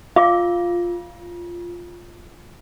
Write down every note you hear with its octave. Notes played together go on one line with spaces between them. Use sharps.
F4 F5 D6